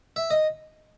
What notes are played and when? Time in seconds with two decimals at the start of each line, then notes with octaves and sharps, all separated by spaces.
0.16 E5
0.31 D#5